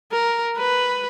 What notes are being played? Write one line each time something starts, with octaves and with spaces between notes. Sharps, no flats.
A#4
B4